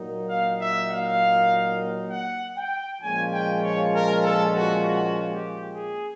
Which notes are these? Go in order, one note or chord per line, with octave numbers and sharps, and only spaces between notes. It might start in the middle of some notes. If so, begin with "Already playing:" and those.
Already playing: A#2 F#3 A#3 D#4
F5
E5
F5
F#5
G5
A#2 F3 G#3 C#4 F4 G#5
G5
C#5
A#4
A4
F#4
F#4
G4
G#4